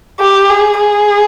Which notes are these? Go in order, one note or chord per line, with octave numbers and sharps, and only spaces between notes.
G4
G#4
G#4